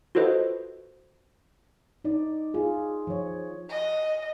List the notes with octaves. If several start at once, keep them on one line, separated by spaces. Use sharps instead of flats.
F4 F#4 A4 B4 C5 D#5
D#4 D5
F4 G#4
F3 C#5
D#5